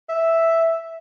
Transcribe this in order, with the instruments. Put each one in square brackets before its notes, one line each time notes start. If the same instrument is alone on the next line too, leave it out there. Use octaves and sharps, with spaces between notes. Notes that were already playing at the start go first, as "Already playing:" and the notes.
[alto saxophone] E5